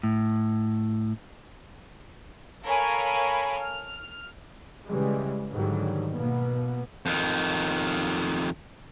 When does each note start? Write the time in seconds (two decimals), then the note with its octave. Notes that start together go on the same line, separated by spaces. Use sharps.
0.03 A2
2.64 A4 A#4 C#5 F5 G#5 B5
3.60 F6
4.86 C#3 E3 G3 G#3
5.51 G#2 D3 D#3 F#3 G3
6.12 B2 A#3 B3
7.06 F2 D#3